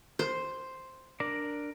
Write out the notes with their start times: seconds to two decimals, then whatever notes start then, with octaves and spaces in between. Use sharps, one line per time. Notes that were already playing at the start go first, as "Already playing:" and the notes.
0.19 C5
1.20 D4 A#4 D5